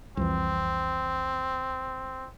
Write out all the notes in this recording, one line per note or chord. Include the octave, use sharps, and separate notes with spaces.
C2 F2 E3 C4